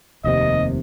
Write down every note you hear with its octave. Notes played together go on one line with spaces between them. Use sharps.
F1 D#2 C3 D#5